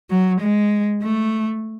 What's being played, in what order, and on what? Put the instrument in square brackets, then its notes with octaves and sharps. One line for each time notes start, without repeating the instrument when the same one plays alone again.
[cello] F#3
G#3
A3